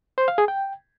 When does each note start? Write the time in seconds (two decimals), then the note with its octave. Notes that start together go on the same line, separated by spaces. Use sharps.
0.18 C5
0.28 F5
0.38 G#4
0.48 G5